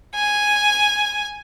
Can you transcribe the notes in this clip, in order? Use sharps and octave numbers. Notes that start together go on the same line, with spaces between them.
G#5